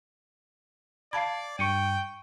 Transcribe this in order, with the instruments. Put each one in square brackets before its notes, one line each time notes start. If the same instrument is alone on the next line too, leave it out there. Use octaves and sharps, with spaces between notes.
[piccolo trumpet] D5 [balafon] F5 A5 B5 [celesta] G#6 C7
[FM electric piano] G2 [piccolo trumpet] G5 [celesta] C#6 C#7 D#7